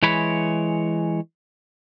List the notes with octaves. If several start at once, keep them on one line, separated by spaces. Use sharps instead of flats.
E3 G#3 C#5 B5